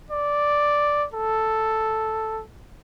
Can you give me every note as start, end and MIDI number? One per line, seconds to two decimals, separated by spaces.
0.11 1.06 74
1.14 2.42 69